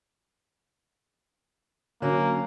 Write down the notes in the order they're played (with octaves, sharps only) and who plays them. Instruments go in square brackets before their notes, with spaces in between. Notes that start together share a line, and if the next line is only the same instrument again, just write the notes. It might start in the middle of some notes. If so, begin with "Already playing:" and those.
[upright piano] D3 F#3 C#4 [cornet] A#3